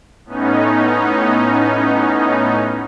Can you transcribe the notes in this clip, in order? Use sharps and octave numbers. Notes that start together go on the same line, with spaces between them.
A2 B3 C#4 D#4